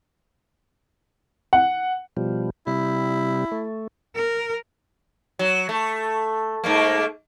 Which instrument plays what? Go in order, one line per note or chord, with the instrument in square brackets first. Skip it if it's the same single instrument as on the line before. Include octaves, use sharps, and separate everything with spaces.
[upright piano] F#5
[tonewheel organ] B2 F3 G3
[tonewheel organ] C3 G3 [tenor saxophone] E4
[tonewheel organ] A3
[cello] A#4
[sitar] F#3
A3
G#2 A3 A#3